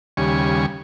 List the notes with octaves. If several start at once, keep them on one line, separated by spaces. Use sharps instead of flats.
D#2 C#3 G3 G#5 C#6